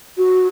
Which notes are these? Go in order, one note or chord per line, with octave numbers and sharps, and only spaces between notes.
F#4